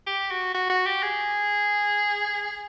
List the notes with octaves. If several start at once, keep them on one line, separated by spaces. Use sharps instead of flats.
G4
F#4
F#4
F#4
G4
G#4